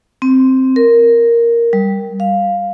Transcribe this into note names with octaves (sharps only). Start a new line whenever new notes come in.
C4
A#4
G3
F5